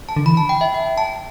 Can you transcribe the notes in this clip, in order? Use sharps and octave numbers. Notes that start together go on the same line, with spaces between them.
A5
D3
E3 B5
A5
G5
E5
G5
A5